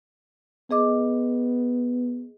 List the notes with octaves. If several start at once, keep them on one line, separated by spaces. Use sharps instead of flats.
B3 G#4 D#5 D6